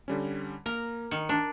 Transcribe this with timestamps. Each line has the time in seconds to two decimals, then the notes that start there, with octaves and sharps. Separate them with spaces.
0.08 D3 G3 C#4
0.66 A#3 A#4
1.11 D#3 C#7
1.29 D4